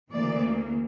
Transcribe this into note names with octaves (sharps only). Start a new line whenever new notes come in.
D2 C#3 E3 A#3 D5